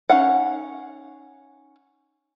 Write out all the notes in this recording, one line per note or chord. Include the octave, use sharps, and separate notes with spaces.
C#4 D#4 F5 F#5